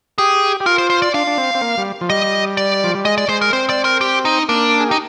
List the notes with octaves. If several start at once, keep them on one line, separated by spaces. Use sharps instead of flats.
G4 G#4
G4
F4 A#4
C5
C5
D5
D4 F5
D4
C4
C4
A#3
G3
F3
G3 D#5
D5
F3
G3
G#3 D#5
D5
G#3 C5
A#4
C4 C5
D5
A#4
G4
D#4
A#3 D4
G#4
D#4 G4